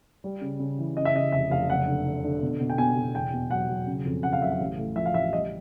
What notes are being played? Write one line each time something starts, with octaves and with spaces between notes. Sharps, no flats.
G3
C#3
C#3
E3
C#3 D#5
E5
C#3 D#5
F1 E5
F1 F5
F#1 F#5
D3
D3
D3
B2
B2
G5
B2 G#5
B2
E2 G5
B2
F#3 F#5
F#3
C#3
F2
C#3 F#5
F5
F#3 E5
F5
A1
A2
F3 E5
F5
A1 E5
G3 D#5